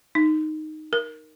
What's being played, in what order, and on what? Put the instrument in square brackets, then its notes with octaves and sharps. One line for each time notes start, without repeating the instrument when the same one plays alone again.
[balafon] D#4
A#4